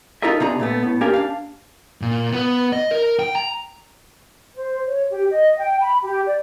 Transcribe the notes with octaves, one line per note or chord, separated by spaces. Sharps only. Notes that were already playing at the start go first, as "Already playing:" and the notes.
D#4 F4 A4 A#4 D#5 E5
C3 B3 D4 D#4 G#4 A#5
A#2 A3 B3
A2 B3
A#3 D4 G4 A#4 F5 G#5
D4 F5
A#2
B3
D#5
A#4
G5
A#5
C5
C#5
G4
D#5
G5
B5
G4
D5